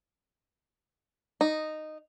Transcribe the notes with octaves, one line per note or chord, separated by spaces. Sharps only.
D#4